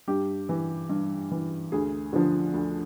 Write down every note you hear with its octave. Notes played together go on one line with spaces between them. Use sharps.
G2 G4
E3
G2
E3
D2 G#4
D3 F3
D2